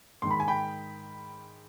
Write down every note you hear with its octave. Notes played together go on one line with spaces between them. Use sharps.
G#2 D#3 C6
B5
G#5
G5 B5